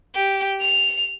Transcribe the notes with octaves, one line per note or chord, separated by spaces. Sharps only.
G4
F7